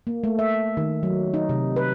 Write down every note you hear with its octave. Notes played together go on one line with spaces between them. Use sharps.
A#3
A3
E5
D#3
F#3
D#4
C3
B4